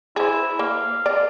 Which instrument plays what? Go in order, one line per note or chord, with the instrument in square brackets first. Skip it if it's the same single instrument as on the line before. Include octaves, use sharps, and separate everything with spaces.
[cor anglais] E4 [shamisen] G#4 C5
[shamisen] A#3 [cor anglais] F5
[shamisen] D5